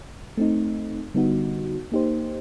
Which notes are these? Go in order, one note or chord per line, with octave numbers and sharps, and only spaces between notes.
A3 C4 D#4
D3 G3 B3 D#4 F#4
A#3 D#4 G4 C5